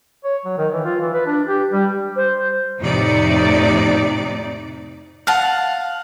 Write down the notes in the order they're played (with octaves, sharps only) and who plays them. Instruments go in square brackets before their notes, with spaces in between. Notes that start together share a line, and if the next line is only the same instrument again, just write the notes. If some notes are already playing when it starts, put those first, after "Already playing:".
[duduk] C#5
F#3
D#3
E3
F4
E3
B4
D4
G4
G3
[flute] C5
[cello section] F2 A2 C3 D#4 D5
[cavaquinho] F5 F#5 A5